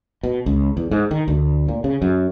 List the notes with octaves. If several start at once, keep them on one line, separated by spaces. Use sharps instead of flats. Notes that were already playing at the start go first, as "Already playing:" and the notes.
B2
C#2
E2
G#2
D#3
D2
A#2
C#3
F#2